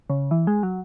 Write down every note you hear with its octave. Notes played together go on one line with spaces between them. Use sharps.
C#3
E3
G#3
F#3